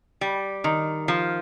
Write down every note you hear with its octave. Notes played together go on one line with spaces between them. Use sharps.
G3
D#3
F3